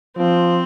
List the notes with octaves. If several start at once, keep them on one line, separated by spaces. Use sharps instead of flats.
F3 C4